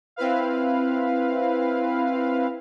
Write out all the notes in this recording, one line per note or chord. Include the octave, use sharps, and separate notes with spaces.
C4 E4 B4 F5